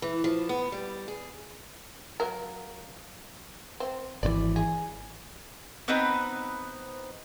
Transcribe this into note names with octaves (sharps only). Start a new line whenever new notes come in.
E3
F3
B3
G3
G#4
F#3 A#3 A#4
C4
G#1 C#3 E3 D5
G#4
B3 C4 D#4 B4